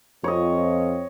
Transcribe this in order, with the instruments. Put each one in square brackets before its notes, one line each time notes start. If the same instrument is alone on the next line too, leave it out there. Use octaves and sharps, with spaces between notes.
[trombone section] F2 C4 F4 [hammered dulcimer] C#5 D#5